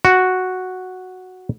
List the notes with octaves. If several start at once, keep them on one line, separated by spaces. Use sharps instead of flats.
F#4